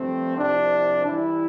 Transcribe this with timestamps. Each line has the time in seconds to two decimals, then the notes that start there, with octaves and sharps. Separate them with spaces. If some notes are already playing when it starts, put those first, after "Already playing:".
Already playing: G2 F3 A3 C4
0.37 C2 C3 F3 D4
1.05 G2 E3 G3 E4